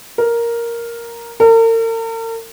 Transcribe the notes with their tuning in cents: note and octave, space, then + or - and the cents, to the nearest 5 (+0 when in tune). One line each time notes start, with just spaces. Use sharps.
A#4 +0
A#4 -45